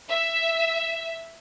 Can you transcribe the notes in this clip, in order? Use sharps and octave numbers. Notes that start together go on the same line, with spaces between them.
E5